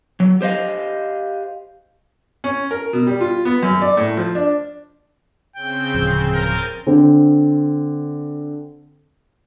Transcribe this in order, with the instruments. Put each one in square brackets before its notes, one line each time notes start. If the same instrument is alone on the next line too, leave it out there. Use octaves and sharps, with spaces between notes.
[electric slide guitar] F#3
G4 C5 D#5 F5
[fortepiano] C#4
A#4
B2
G3
F4
B3
F#2
D5
A2
F3
D4
[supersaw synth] C#3 C4 G6 [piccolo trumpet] G5
[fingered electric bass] D1 F3
[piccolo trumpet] A#4 [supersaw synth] G6 A6 D#7
[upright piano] D3 C4